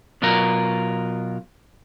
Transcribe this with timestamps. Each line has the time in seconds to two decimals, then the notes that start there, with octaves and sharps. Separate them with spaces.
0.22 B2 F#3 F4 A#4